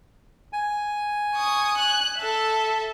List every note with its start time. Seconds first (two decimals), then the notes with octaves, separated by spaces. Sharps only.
0.53 G#5
1.35 C#6 D#6
1.77 F#6
2.16 A4 E5